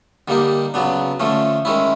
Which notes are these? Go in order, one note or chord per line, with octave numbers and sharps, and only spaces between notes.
D3 G3 A#3 D#4 G4
C#3 F#3 B3 D4
D3 F3 A3 C#4
D#3 G#3 C#4 E4